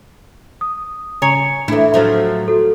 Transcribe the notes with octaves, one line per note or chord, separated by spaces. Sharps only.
D#6
C#3 C#5 G#5 A#5 C#7
A2 E3 D4 E4 A4
F3 F#3 A3
F#4 A4